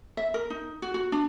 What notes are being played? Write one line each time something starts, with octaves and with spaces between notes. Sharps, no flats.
E5
A#4
D#4
F#4
F#4
D4